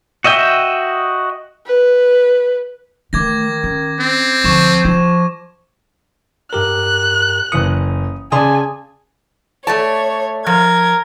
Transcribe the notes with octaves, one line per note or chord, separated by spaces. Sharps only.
F#4 D#5 E5 G5
B4
D#3 E3 A3 D6 G#6 A#6
C#4
C4
D2 D3 F3 C#6 E7
F3 F4
G2 G4 A#4 F#6
F#1 E3 D#6 C#7
C#3 G#4 D5 G#5 A5 C6 D#6
A3 C#5 D5 A5
F3 A#4 G#6